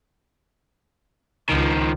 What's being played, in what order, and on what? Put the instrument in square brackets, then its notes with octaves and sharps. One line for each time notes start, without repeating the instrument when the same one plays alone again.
[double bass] C#2 [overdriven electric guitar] D#3 F3